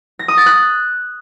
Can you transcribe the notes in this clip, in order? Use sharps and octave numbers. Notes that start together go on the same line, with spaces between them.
A#6
D#6
A6
F#6